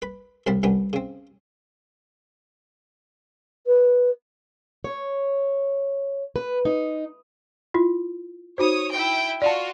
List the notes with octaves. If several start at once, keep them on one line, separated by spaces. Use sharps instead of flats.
B4 B5
C2 A2 C4 F5 A5 B5
C2 B3 C#4 D4 G5
C#3 C4
B4
C#5
B4
D#4
E4 F4
D#4 F#4 C5 C#5 D#6
E4 G5
F4 F#4 D5 A5